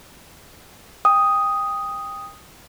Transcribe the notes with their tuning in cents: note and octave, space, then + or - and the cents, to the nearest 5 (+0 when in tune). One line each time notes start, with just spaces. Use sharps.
G5 +20 D#6 +0